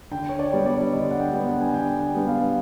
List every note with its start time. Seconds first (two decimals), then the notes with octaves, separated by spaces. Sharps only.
0.11 D3 G5
0.29 C#5
0.39 D5
0.53 G3 B3 D4
0.66 D5
0.92 D3 D#5
1.11 F#5
1.20 G5
1.32 G3 B3 D4
1.46 F#5
1.61 G#5
1.73 D3 G5
2.01 G5
2.14 G3 B3 D4
2.27 F5